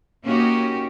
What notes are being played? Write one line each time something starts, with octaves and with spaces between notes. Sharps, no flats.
A#3 C#4 D#4 F#4 G4